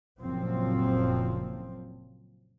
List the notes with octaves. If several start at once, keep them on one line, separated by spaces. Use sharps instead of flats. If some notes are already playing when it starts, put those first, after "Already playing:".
F#1 F#2 A#2 F3 C4